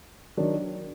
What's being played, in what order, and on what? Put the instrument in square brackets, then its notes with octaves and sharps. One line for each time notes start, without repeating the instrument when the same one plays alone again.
[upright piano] D#3 F#3 D4